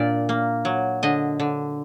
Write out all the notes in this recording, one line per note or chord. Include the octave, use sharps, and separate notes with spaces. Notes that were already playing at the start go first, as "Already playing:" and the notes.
Already playing: A#2 D4 D5
A#3
F#3
D3 D#5
D3